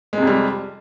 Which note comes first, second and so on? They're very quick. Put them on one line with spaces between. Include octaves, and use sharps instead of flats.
G#3 C3 F2 G3